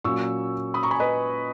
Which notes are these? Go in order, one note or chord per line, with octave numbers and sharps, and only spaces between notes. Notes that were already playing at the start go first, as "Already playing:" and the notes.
A#2 F#3 A#3 C#4 C#6 E6
B5 D#6
A#5 C#6
G#5 B5
B4 D#5